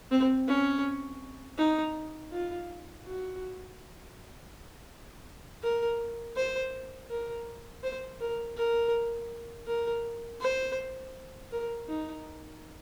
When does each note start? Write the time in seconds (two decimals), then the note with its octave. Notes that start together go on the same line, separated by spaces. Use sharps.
0.11 C4
0.48 C#4
1.58 D#4
2.32 F4
3.05 F#4
5.63 A#4
6.36 C5
7.10 A#4
7.83 C5
8.20 A#4
8.57 A#4
9.67 A#4
10.41 C5
11.52 A#4
11.88 D#4